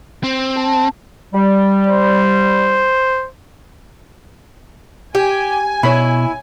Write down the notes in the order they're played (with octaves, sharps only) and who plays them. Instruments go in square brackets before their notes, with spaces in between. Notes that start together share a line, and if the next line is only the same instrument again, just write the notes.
[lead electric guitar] C4
[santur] A5
[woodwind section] G3
[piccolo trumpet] C5
[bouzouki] G4 [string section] G#5
[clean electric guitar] B2 [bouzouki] E4 [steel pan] C#5 B5